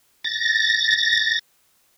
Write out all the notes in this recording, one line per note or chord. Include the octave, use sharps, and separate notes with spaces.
A6 A#6